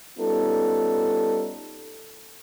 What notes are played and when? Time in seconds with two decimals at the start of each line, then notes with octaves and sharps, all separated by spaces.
0.19 G3 B3 C#4 D#4 F4 A4